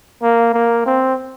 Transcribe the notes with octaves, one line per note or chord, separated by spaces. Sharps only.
A#3
A#3
C4